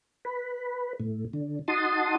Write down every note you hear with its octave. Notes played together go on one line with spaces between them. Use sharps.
B4
A2
D3
D#4 F#4 A5 C6 D#6